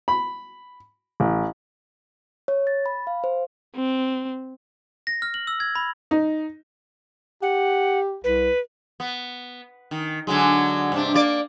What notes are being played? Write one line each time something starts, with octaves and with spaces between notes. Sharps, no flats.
B5
A1
C#5
A6
B5
F5
C5
C4
A#6
F6
F#7
E6
G#6
B5
D#4
G4 F#5
C2 B4
B3
D#3
D3 F#3 G#3
G2 C3 D4
A#3 D5